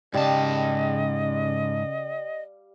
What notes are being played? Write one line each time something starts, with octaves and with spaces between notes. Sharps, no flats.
G#2 C#3 G3 D#5 F5 G5 A5